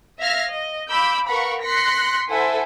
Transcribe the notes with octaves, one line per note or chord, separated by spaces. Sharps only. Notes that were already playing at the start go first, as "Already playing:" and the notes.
E5 F5 F6 G#6 A#6
D#5
F5 B5 D6 E6 G6
A#4 B4 F5 F#5 B5 C#6
C6 F#6 A#6 B6 C#7
E4 A4 C5 E5 F#5 G#5